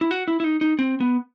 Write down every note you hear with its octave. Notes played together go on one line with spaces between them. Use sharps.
E4
F#4
E4
E4
D#4
D#4
C4
B3